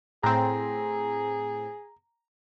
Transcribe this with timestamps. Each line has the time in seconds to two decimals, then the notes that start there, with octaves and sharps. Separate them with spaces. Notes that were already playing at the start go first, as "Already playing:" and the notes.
0.23 A2 C4 G#4 A#5